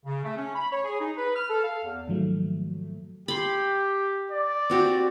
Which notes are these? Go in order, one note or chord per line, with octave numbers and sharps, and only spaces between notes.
C#3
A3
C#4
B5
C#5
G#4
D#4
B4
F6
A4
F5
E2
G#2 D#3 F3 F#3 A3
G4 B5 C6
D5
C4 F#4 G4